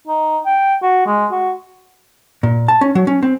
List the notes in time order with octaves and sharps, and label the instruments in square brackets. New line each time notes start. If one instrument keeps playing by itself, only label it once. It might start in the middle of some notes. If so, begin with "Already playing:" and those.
[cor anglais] D#4
G5
F#4
G#3
F#4
[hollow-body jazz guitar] A#2
A5
C#4
F#3
C#4
C4